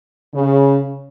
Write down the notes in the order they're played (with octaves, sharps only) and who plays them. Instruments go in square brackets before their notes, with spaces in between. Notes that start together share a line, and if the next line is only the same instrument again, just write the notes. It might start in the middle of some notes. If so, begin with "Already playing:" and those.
[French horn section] C#3